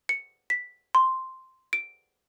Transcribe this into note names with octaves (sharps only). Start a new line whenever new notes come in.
C#7
B6
C6
D7